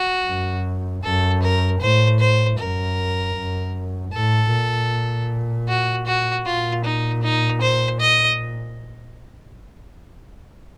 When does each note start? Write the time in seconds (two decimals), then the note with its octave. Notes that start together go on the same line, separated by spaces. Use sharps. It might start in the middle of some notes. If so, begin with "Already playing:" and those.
Already playing: F#4
0.26 F#2
1.03 F#2 A4
1.42 A#4
1.81 A2 C5
2.19 C5
2.58 F#2 A#4
3.35 F#2
4.13 A2 A4
4.52 A#2
5.68 F#4
6.06 F#4
6.45 A#2 F4
6.84 D#4
7.23 D#4
7.61 C5
8.00 D#5